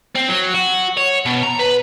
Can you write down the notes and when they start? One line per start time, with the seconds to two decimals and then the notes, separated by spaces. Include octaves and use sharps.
0.15 C4
0.29 F#3
0.54 F#4
0.97 C#5
1.25 B2
1.43 A#5
1.59 B4